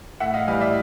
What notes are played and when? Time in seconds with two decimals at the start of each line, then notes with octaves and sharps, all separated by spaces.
0.20 A2 E5 F#5
0.34 D#5 F5
0.47 E3 G3 D#5 F5
0.61 D5 E5